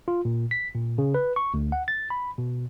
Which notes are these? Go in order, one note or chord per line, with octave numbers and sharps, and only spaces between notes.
F4
A#2
B6
A#2
C#3
B4
C#6
D2
F#5
A6
B5
B2